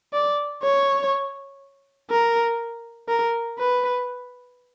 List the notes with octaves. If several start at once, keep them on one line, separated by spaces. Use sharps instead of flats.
D5
C#5
A#4
A#4
B4